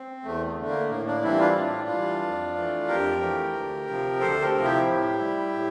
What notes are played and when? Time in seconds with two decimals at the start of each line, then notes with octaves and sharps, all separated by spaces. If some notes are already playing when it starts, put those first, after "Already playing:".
Already playing: C4
0.23 E2 A3
0.46 A3
0.57 D3 A3
0.68 A#3
0.89 A2 A#3
1.06 A#3 D4
1.22 E3 G3 C4 E4
1.39 D4 F4
1.56 A2
1.89 E3 G3
2.22 F2
2.55 E3 A3
2.88 F2 G4 A#4
3.21 E3 A3
3.54 D2
3.88 C3 F3
4.20 D2 A4 C5
4.42 G4 A#4
4.53 C3 F3
4.64 E4 G4
4.86 A2
5.19 G3
5.53 A2